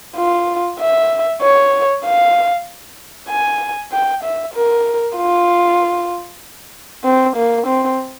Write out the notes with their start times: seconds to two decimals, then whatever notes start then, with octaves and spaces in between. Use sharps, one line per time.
0.16 F4
0.79 E5
1.42 C#5
2.05 F5
3.29 G#5
3.93 G5
4.24 E5
4.54 A#4
5.17 F4
7.05 C4
7.36 A#3
7.67 C4